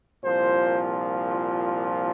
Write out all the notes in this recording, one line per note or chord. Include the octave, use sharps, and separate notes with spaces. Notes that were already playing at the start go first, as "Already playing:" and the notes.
C2 A#2 F3 C5